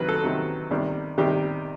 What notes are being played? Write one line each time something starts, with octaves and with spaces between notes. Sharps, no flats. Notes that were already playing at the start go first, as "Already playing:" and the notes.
Already playing: C3 D#3 F#3 B4
A4
C3 D#3 F#3
C3 D#3 G3
C3 D#3 G3 G4